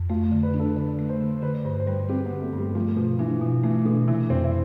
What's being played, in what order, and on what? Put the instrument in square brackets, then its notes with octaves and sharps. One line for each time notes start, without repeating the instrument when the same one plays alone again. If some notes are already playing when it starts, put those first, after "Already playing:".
Already playing: [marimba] F2
[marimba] A3 [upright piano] F4
[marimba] D3
[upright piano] B4
[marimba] D4
[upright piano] A4
[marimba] D3 [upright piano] B4
[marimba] A3
[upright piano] C5
[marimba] D3
[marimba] D3 [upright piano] B4
[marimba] G2 [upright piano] C5
[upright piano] C5
[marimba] G3 [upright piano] B4
[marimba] C4 [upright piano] G4
[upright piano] B3
[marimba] D3
[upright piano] A3
[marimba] G2
[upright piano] G3
[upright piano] F3 [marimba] A3
[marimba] B2 [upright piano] F3
[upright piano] E3 [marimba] D4
[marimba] B2 [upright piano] E3
[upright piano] E3 [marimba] A3
[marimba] B2 [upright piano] D3
[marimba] C3 [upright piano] E3
[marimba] F2 [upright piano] C4
[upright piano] E4